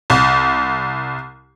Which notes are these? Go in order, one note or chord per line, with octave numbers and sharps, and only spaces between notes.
C2